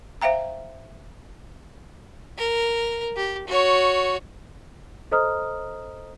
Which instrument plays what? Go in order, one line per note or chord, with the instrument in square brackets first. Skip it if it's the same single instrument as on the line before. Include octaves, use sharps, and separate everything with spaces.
[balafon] C5 E5 F5 G5 A#5
[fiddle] A#4
G4
F#4 C#5
[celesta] A4 C5 D#5 A#5 D#6 F6